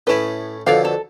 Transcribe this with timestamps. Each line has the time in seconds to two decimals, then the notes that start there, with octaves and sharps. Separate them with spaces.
0.07 A2 C#4 E4 B4 B5
0.67 F2 B2 D3 C#5 D5 F5
0.85 A4